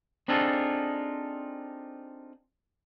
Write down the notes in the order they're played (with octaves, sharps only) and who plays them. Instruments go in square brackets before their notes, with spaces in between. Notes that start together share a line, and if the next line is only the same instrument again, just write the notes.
[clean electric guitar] C4 D4 D#4 F4 G#4 A4